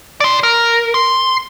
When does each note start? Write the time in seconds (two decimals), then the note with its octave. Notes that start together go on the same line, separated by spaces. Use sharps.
0.20 D5 C6
0.43 A#4
0.94 C6